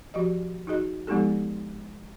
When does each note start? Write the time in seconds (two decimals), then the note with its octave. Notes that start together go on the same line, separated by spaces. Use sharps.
0.14 F3 F#4 G4 D#5
0.67 D#4 F#4 G#4 D#5
1.07 F3 G#3 B3 D#4 G4 A4